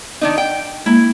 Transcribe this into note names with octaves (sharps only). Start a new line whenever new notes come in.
D#3 D4 D#4
G5
G#3 A#3 E4